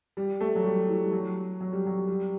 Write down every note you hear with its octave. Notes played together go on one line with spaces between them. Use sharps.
G3
A3
F#3
G3
E3
G3
F#3
F#3
G3
F#3
G3